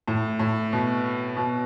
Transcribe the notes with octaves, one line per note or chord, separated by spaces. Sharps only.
A2
A2
B2
B2